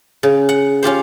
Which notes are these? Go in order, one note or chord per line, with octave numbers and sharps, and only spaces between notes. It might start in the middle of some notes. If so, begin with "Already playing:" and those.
C#3
F#5
C#4 F4 G4 C5